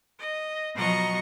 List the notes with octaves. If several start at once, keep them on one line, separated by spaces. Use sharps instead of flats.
D#5
B2 F3 F#3 D#5 A#5 C#6